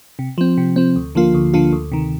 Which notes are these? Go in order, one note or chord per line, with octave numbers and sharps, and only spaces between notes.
C3
F3 C4
C3
F3 C4
D2
D3 F3 A#3 F4
D2
D3 F3 A#3 F4
D2
C3 D#3